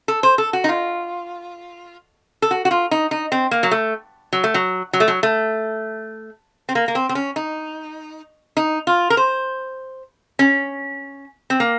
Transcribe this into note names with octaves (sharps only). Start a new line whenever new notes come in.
A4
C5
A4
F#4
D#4
F4
A4
F#4
F#4
F4
D#4
D#4
C4
A#3
F#3
A3
F#3
A3
F#3
F#3
A3
F#3
A3
C4
A#3
A#3
C4
C4
C#4
D#4
D#4
F4
A#4
C5
C#4
C4
A#3